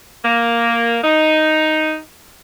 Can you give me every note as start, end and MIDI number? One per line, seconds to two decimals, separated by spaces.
0.24 0.97 58
1.03 1.97 63